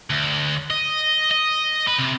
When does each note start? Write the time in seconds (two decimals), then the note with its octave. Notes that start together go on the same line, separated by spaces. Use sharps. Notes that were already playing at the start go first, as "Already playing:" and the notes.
0.10 D2
0.70 D#5
1.31 D#5
1.88 B4
1.99 C3